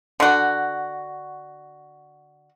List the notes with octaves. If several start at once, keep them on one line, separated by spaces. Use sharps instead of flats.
D3 F#4